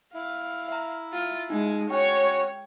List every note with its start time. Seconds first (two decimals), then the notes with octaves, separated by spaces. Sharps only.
0.14 E4 F5
0.68 E5 A#5
1.13 F4
1.50 G#3 D#4
1.90 C#4 F#4 C#5 G5